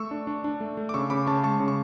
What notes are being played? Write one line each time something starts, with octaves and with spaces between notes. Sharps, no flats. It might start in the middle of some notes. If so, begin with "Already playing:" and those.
Already playing: A3 C#6 E6
D4
D4
D4
A3
A3
D6
C#3 C#6 E6
C#3 B5 D6
C#3 A5 C#6
G#3 A5 C#6
C#3
C#6